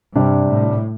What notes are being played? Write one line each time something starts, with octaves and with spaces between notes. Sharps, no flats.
G2 C3 G3 D4
A2